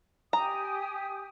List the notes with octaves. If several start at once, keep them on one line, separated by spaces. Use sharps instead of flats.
G4 G#5 A#5 D#6